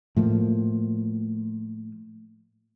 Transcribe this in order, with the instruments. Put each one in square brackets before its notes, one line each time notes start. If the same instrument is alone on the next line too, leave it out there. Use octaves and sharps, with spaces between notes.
[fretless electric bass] A2 F3 A#3